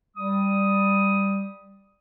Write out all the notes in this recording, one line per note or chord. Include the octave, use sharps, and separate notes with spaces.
G3 D#6